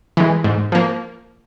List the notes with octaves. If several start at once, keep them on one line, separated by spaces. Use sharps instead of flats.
E3 G#3
G#2
F3 A#3